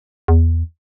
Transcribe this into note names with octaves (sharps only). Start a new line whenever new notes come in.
E2